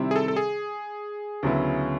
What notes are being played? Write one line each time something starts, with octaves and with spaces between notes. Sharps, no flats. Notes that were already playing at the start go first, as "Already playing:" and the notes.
Already playing: C3 D#3 G3 C4 E4
G#4
A4
A4
G#4
D2 C#3 F#3 B3 E4